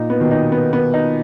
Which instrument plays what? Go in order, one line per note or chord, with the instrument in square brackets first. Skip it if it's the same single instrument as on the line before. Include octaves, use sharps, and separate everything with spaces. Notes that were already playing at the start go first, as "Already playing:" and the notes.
Already playing: [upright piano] A#2 [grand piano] D#4
[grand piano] B3
[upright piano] B2 D#3
[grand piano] D#4
B3
B3
D#4